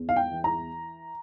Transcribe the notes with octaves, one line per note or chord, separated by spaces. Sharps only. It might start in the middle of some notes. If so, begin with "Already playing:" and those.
Already playing: E2
F5
G5
E3
A#5